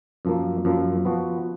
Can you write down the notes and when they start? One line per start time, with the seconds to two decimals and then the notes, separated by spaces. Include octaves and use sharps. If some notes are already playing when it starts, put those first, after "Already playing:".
0.25 F#2 F3 A#3
0.65 F#2 F3 A#3
1.05 F3 B3 F#4